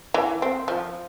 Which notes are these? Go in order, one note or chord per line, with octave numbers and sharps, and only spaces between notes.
E3
C4
F3